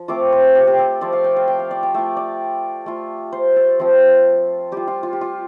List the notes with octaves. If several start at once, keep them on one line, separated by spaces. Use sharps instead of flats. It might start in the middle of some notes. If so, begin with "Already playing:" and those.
Already playing: F3
A3 C4 F4 D6
C5
G4
G4
A4
F3 A3 F4 D5
F5
G5
F5
G5
F5
D5
G5
A3 F4 G5
D5
A3 F4
C5
A4
F3 C4 F4
G3 F4 G4
F4
F4
G4
F4